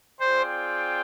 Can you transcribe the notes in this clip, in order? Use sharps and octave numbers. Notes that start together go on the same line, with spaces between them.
C4 F4 G#4 C5 D5 G5